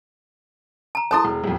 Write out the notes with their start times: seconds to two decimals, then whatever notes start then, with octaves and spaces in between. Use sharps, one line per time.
0.95 A5 A#5
1.11 E4 A4 C5 A5 C6 D#6
1.25 E1
1.44 D#1 F2